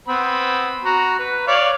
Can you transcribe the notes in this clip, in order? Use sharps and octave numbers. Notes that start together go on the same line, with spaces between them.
B3 C4 B5
F#4 A#5
B4
C#5 D5 F5